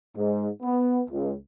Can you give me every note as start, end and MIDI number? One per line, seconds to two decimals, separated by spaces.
0.16 0.47 44
0.62 1.01 59
1.10 1.33 37